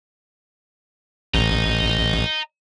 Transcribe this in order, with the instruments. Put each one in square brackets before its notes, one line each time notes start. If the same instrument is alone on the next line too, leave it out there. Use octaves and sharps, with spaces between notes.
[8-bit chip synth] A1 [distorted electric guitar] D#5 A#5